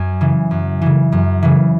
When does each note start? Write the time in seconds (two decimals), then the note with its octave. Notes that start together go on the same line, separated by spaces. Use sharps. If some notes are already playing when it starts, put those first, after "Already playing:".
Already playing: F#2 G#5
0.21 C#3 E3
0.51 F#2
0.82 C#3 E3
1.12 F#2
1.43 C#3 E3